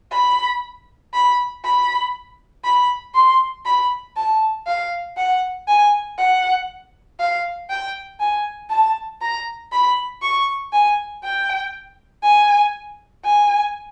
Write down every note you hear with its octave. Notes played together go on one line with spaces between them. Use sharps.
B5
B5
B5
B5
C6
B5
A5
F5
F#5
G#5
F#5
F5
G5
G#5
A5
A#5
B5
C#6
G#5
G5
G#5
G#5